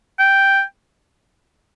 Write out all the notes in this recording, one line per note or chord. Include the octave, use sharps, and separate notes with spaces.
G5